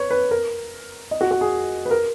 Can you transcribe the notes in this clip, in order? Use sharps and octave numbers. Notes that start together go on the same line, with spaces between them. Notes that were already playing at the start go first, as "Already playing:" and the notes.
Already playing: B4 C#5
B4
A#4
D#5
F#4
F#4
G#4
B4
A#4